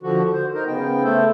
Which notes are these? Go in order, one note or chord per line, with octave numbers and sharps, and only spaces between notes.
D3 F3 F#4
C5
D#4 A#4 C5
C#3 B3 G5
A3 A4 C5